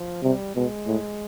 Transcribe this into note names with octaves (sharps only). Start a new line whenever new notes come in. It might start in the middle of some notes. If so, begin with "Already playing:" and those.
Already playing: F3
C3 G3
B2 G#3
A2